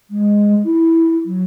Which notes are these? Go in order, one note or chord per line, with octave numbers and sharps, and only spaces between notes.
G#3
E4
F#3